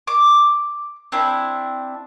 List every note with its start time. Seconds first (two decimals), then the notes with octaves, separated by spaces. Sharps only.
0.07 D6
1.12 C4 D4 E4